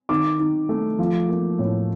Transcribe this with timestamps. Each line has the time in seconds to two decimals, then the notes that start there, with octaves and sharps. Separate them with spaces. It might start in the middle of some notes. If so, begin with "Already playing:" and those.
0.09 D#3 D6
0.40 D#3
0.69 A3
0.99 F3
1.29 A#3
1.59 A2